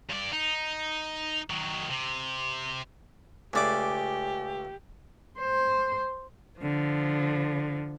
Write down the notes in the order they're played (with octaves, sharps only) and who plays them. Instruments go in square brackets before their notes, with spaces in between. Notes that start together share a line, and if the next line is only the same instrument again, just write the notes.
[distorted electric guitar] G2 D5
D#4
D#3 F#3
C3
[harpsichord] C#2 A3 D6 [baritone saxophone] G4 [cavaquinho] G#4 D5 F5
[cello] C5
[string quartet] D3 F3